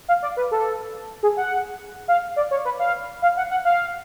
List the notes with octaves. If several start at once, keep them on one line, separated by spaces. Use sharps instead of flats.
F5
D5
B4
A4
G#4
F#5
F5
D5
C#5
B4
F5
F5
F#5
F#5
F5